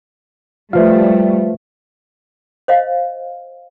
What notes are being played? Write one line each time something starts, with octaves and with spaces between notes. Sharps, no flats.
F3 G3 A3 F4 B4 E5 F5
C5 D#5 F5